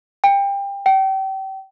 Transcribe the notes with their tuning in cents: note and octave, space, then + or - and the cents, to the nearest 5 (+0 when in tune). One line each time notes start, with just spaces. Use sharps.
G5 +25
G5 -30